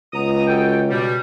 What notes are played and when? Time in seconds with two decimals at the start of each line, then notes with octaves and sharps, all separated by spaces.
0.13 C#2 B3 A#5 D#6
0.48 F#4 A4 G5
0.90 B2 G3